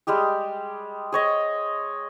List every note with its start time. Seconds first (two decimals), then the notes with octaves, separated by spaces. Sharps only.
0.07 G3 G#3 G4 G#4
1.12 G#4 C#5 D#5